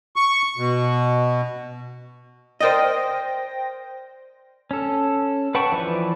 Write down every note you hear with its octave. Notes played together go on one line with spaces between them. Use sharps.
C#6
B2
A#4 C5 D5 D#5 G5 A#6
C#4 A4
B4 F#5 G5 A5 C#6
E3 F3 D4 B4